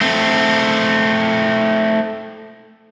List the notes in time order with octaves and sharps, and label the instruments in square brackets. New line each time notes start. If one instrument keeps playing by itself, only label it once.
[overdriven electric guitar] A3 C4